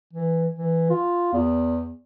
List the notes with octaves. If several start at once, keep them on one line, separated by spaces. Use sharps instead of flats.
E3
E3
F4
E2